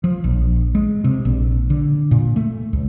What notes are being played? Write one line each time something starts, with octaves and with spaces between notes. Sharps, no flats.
F3
A#1
G#3
C3
A#1
D3
A#2
A3
C#2